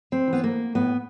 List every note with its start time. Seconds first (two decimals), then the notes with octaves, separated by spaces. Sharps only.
0.12 C4
0.28 E3
0.33 B3
0.44 A#3
0.75 A2 B3